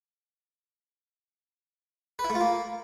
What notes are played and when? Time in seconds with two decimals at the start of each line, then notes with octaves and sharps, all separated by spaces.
2.19 B4
2.24 E4
2.30 A3
2.35 F4
2.41 A#3